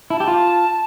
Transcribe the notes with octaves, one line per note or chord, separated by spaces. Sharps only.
E4 A5
G4
F4